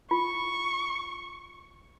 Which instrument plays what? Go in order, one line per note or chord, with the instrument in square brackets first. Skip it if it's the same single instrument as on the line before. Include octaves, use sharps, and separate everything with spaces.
[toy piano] F4 [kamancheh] C#6